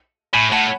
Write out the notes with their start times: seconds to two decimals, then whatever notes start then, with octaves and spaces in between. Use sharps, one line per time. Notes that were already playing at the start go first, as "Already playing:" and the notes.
0.33 A2 G#5 B5
0.52 A2 F#5 A5